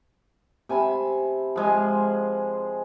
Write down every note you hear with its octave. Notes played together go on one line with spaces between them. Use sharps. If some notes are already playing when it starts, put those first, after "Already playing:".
C3 G#5 A5 B5
F3 G#3 G#5